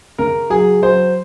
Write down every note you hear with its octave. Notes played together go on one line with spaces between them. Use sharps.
C#3 A#4
F#3 G#4
F#3 C5